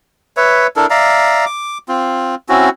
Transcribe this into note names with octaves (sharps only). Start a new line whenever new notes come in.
B4 C#5 E5
D4 E4 A4 A#4
D5 E5 F5 A#5
D6
C4 F4
C4 C#4 E4 F#4